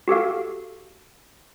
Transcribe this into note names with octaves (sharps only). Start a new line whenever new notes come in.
F#4 G4 A4 F5